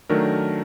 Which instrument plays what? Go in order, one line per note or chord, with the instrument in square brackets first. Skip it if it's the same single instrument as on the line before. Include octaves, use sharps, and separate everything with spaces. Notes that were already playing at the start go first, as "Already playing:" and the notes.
[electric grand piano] D#3 F#3 A3 D4 A#4